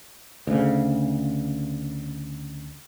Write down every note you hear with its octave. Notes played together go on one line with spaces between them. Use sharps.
D2 C#3